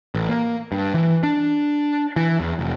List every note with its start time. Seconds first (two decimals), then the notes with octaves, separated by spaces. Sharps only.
0.15 A1
0.29 A#3
0.72 G2
0.94 E3
1.23 D4
2.16 E3
2.40 E2
2.59 F1